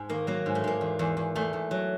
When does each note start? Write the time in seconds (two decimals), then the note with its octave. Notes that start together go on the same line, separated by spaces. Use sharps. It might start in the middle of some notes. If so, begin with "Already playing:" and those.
Already playing: G#2
0.09 D#3 A#3
0.27 F#3 A#3
0.46 G#2
0.55 A3
0.64 G#2 A#3
0.81 E2
0.99 E2
1.17 E2
1.35 E2 A3
1.53 E2
1.71 F#3